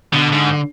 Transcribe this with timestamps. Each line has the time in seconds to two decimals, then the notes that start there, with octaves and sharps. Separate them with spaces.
0.13 B2 D3
0.33 G#2